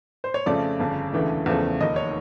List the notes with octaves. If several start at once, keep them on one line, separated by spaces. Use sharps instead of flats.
C5
C#5
F2 C#3 F3 A3 D5
G1 F2 C#3
E1 D2 C#3 E3 A3
E2 C#3 F3 A3
F1 D#2 D#3 D#5
C#5